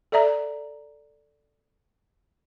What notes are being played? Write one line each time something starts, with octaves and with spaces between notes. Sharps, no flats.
A4 D5 E5 A#5